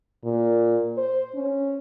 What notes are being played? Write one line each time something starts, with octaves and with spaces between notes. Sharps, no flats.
A#2
C5
C#4